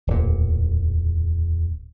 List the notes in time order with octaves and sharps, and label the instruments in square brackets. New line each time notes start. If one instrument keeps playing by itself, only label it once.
[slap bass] D1 A#2 [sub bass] E2